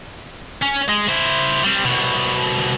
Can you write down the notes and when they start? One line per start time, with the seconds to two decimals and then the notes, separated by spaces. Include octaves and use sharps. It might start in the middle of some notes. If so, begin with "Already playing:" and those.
0.62 C#4
0.89 G#3
1.09 E4 C5
1.64 G3 C4
1.85 C2 B2